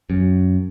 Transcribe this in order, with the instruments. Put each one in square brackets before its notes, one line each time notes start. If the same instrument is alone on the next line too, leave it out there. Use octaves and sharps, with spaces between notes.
[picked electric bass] F#2